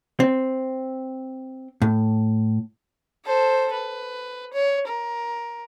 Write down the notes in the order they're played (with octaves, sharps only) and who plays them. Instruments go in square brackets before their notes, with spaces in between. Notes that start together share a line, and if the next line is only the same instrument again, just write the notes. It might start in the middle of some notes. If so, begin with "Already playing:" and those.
[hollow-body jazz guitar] C4
A2
[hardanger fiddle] A4 C5
B4
C#5
A#4